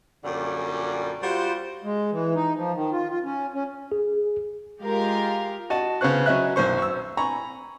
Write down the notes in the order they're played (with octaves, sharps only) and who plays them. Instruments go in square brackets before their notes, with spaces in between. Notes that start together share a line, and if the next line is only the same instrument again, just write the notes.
[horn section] F#2 A#2 D3 G3
G3 F4 F#4 C5
[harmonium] G#3
E3
D#4
F3
D#3
F4
F4
C#4
C#4
[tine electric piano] G#4
[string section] G#3 F4 G4 A#4 F5
[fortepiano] F#4 D#5 A5
C#3 B3 C#4 C5 C#6 F#6
F#3 C#4 D#5 E5 F#6
B1 F#2 C5 C#6
C#6 E6
G#5 A#5 B5 C#6